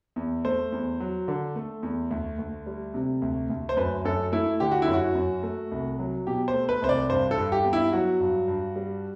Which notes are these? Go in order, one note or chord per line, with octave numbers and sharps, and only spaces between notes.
E2
A3 C5
E2
F#3
D3
A3
E2
D2
D2
G3
C3
D2
D2
C5
F#2 B4
F#2 A4
A3 E4
D3 G4
F#4
E4
F#2
F#4
F#2
A3
C2
F#3
B2 G4
C5
A3
B4
C2 C5
D5
G2 C5
A4
G2
G4
B3
E4
F#3 F#4
G2
G2
G3